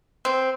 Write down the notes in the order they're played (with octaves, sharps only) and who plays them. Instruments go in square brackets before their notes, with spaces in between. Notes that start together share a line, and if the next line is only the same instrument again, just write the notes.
[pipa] C4